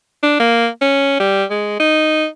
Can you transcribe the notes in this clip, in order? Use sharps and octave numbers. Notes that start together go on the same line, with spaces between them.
D4
A#3
C#4
G3
G#3
D#4